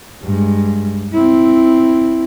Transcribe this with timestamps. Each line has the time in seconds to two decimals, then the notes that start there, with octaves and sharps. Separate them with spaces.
0.23 G2 G#3
1.13 C4 E4